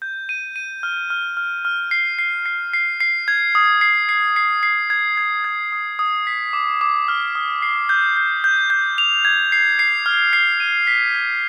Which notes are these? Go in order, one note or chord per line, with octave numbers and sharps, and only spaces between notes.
G6
D#7
D#7
F6
F6
F6
F6
C7
C7
C7
C7
C7
G#6
D#6
C7
C7
C7
C7
G#6
G#6
G#6
D#6
D#6
B6
D6
D6
F6
D#6
C7
G6
G6
G6
G6
F7
G#6
C7
C7
F6
C7
D#7
B6
G#6